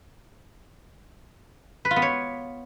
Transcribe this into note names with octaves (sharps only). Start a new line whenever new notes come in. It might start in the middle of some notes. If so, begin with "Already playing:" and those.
B4
F4
B3
C#5